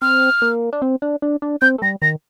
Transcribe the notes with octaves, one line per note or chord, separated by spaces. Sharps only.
C4 F6
A#3
D4
C4
D4
D4
D4
C4 G6
A3
G3 A#6
D#3 A#6